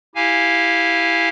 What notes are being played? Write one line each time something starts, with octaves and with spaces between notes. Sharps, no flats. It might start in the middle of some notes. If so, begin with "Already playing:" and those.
E4 G4 F5 G#5